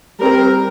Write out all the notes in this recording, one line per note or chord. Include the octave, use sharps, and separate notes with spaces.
G3 C4 A#4